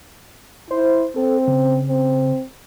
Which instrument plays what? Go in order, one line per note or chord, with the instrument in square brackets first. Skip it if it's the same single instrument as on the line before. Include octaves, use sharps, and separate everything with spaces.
[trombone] E4 [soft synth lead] C5
[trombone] C4 [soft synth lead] A4
[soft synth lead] C#3
[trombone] C4